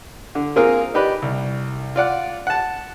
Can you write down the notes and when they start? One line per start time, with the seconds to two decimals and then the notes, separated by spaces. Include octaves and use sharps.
0.35 D3
0.56 A#3 C4 F4 G#4 A#4
0.94 D#4 G4 B4 D5
1.22 C2
1.96 F4 D5 F#5
2.47 F#5 A5